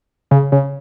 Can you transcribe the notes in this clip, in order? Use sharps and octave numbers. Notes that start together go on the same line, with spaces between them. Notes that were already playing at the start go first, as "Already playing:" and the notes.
C#3
C#3